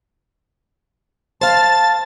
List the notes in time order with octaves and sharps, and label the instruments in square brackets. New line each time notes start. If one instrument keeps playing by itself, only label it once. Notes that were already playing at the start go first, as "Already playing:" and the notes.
[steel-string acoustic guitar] C5 F5 [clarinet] A5 [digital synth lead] A6